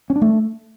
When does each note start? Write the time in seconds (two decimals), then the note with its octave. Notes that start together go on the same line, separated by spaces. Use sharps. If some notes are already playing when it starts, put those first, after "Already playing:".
0.10 C#4
0.16 D4
0.22 A3